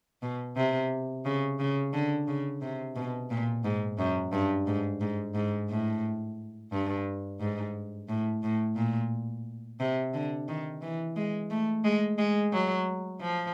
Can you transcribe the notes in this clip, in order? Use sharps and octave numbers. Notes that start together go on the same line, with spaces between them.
B2
C3
C#3
C#3
D3
C#3
C3
B2
A#2
G#2
F#2
G2
G#2
G#2
G#2
A2
G2
G#2
A2
A2
A#2
C3
D3
D#3
E3
G#3
A3
G#3
G#3
F#3
F3